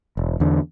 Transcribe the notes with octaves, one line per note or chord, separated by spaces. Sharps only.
E1
E2 D3